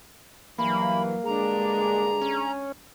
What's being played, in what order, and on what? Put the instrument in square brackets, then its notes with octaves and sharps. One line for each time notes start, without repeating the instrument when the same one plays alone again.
[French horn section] G2 E3 [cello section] F#3 [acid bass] A#3 [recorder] B5
[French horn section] G2 D3 G#4 [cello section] G#3 D4 [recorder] A#5
[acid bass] C#4